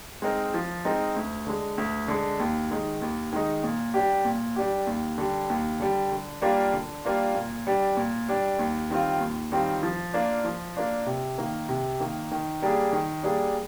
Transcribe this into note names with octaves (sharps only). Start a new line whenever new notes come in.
G#3 C4 D#4 A#4
F3
G#3 C4 D#4 A#4
D2
D3 G#3
D2
D3 G#3
D#2
D#3 G#3 D#4
D#2
D#3 G#3 D#4
A#2
G3 D4 G4
A#2
G3 D4 G4
D#2
D3 G3
D#2
D3 G3
D3
G3 A#3 D4 F4
D3
G3 A#3 D4 F4
A#2
G3 D4
A#2
G3 D4
D#2
D#3 G3 C4 F4
D#2
D#3 G3 C4 F4
F3
A#3 D4 F4
F3
A#3 D4 F4
C3
D#3 A#3
C3
D#3 A#3
D#3
G3 A#3 D4 G#4
D#3
G3 A#3 D4 G#4